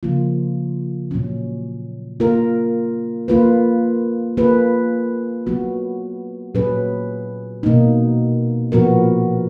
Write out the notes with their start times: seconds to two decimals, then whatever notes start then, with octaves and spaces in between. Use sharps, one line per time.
0.03 C#3 F3 A#3 F4
1.11 A#2 F#3 C#4
2.20 A#3 F4 A#4
3.28 A#3 F4 B4
4.37 A#3 F4 G#4 B4
5.47 F#3 B3 F#4
6.55 A#2 F#3 C#4 G#4 B4
7.63 B2 A#3 D#4
8.72 A#2 F3 B3 F#4 A#4